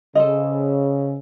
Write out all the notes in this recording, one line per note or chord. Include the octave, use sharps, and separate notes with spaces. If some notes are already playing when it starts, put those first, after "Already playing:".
C#3 A4 C5 D#5